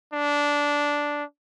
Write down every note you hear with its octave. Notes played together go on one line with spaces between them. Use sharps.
D4